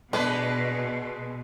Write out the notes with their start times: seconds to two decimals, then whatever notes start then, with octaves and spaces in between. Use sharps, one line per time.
0.13 B2 G#3 D4 G#4 B4